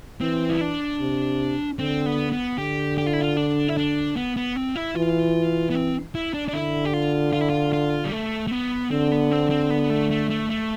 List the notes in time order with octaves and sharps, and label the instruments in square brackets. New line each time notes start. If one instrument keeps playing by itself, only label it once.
[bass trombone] E3 [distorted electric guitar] C4
[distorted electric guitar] E4
D4
[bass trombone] C3
[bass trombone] D3 [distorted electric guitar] C4
[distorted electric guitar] B3
B3
[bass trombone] D3 [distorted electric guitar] G4
[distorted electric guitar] G4
F4
E4
F4
D4
E4
D4
B3
B3
C4
E4
[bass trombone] E3 [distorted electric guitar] F4
[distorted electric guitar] B3
C4
E4
D4
D4
[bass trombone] D3 [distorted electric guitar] E4
[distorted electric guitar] G4
F4
F4
E4
F4
F4
G3
A3
A3
B3
[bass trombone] D3 [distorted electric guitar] C4
[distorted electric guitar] B3
C4
C4
B3
A3
A3
A3
A3